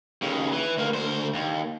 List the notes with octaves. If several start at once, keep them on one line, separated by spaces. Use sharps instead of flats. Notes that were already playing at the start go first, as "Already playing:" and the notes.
D#2 C#3
E3
D2 A#3
D2 C5
D#2